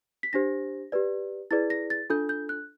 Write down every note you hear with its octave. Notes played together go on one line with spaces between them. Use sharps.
B6
D4 G4 C5 A#6
G4 B4 D5
E4 G#4 B4 D5 A6
A#6
A6
D4 F4 A4 G6
G6
F#6